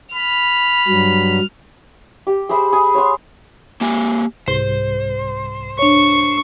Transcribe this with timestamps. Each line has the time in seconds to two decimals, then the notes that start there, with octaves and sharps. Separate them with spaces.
0.14 B5 F6
0.88 G2 F#3
2.27 G4
2.49 G#4 C5 E5 B5
2.73 G#4
2.94 C#5 F#5 C6
3.81 A#3 G4 G#5
4.48 C2 G#2 C5
5.79 D4 C#5 C#6